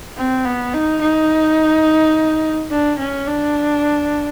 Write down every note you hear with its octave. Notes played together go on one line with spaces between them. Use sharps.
C4
B3
D#4
D#4
D4
C#4
D4